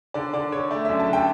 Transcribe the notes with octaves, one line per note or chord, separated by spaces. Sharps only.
D3 D5
D3 D5
D3 C#5
A3 D5
F#2 E5
A5
D3 G5